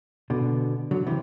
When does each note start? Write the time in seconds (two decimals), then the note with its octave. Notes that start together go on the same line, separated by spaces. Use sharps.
0.30 B2 D3
0.91 D3 F#3
1.07 C3 E3